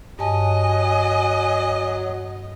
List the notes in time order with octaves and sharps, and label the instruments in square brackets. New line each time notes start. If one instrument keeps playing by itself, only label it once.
[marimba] G2 A5 [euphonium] F#3 [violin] D#5 [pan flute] G#5